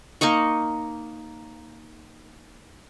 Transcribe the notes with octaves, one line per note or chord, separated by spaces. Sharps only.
A#3 D#4 D#5 C#6